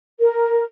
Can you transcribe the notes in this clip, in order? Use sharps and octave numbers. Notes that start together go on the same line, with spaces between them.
A#4